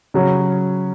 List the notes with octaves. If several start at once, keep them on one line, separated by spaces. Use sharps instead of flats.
C#3 F#3 C#4